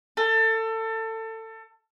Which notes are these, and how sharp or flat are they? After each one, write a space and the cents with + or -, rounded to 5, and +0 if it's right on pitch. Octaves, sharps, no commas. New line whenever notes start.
A4 +25